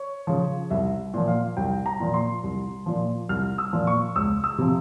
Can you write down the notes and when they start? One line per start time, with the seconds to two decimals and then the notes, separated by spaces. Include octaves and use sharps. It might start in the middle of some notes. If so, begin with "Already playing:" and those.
Already playing: C#5
0.27 C#3 F3
0.70 C2 E5
1.14 A#2 F3
1.28 F5
1.57 C2 G5
1.86 A#5
2.00 A#2 F3
2.14 C6
2.43 C2
2.86 A#2 F3
3.29 C2 F6
3.58 E6
3.73 A#2 F3
3.87 C#6
4.16 C#2 E6
4.44 E6
4.58 C3 F3